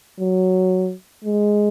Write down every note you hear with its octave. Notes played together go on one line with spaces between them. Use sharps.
F#3
G#3